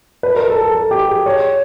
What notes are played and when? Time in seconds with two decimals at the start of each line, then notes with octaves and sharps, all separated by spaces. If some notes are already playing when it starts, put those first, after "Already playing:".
0.23 B4
0.36 A#4
0.50 A4
0.62 A4
0.75 A4
0.91 G4
1.09 G#4
1.26 C#5